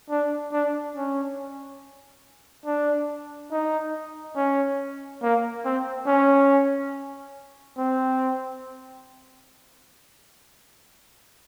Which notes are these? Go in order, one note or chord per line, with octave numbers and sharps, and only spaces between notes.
D4
D4
C#4
D4
D#4
C#4
A#3
C4
C#4
C4